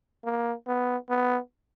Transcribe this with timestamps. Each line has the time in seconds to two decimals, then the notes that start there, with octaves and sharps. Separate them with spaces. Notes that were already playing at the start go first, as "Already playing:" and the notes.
0.24 A#3
0.67 B3
1.09 B3